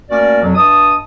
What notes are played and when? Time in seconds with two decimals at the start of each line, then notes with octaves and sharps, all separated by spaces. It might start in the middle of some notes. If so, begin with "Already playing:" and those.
0.10 A3 A#3 C#4 F#4 A#4 D5
0.42 F2 B2 F#3
0.55 G2 D#5 A5 D#6